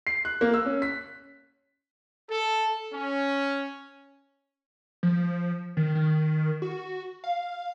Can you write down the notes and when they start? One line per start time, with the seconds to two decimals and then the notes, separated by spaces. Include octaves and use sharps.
0.07 C7
0.25 F#6
0.41 A#3
0.54 E6
0.66 C#4
0.82 B6
2.29 A4
2.92 C#4
5.03 F3
5.77 D#3
5.95 D#3
6.62 F#4
7.24 F5